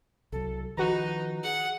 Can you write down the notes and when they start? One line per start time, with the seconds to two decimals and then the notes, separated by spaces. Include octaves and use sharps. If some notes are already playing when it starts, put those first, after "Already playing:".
0.32 C2 F#3 A4
0.77 D#3 F3 D#4 F#4 B4 A#5
1.44 G#4 F#5